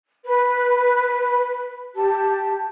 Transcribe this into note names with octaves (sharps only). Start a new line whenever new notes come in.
B4
G4 A5